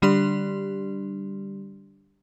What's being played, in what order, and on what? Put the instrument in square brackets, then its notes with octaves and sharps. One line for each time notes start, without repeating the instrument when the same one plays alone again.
[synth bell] D3 G3 D4 G4 D5 C6